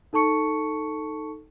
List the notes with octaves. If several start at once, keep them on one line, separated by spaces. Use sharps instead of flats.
D#4 A4 A5 C#6 C#7